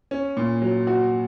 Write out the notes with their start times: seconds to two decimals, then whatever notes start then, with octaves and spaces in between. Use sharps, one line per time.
0.11 C#4
0.37 A#2
0.62 F#3
0.87 F#4